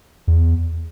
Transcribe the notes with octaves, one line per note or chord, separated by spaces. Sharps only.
E2